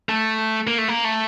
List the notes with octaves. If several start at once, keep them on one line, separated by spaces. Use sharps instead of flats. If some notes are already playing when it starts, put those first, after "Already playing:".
A3
A#3
A3
A#3
A3